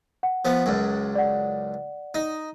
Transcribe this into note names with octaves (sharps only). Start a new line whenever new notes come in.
F#5
F3 B3
C#2 F#2
D5 F#5
D#4